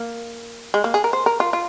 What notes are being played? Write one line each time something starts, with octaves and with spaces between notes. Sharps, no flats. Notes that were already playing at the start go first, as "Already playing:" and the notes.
Already playing: A#3
G#3
A#3
G#4
A#4
C5
A#4
F4
F4